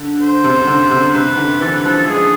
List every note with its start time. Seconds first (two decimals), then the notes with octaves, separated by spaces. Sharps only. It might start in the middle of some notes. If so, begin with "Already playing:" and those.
Already playing: D3
0.21 C5
0.44 C3
0.67 D3
0.91 C3
1.15 C3 B4
1.38 D3
1.61 E3 A4
1.74 B4
1.85 F3 A4
2.08 G#3 G#4